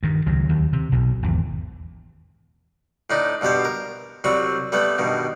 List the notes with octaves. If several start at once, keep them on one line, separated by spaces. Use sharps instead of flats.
G2 D#3
C#2 D#3 F#3
D#2 D#3
C3
B1 B2
G#1 E2
A2 D4 D#4
G2 B2 B3 G4 C5
A#4
C2 F#3 G3 C4 C#6
G3 A3 B3 B4
G2 B2 D#3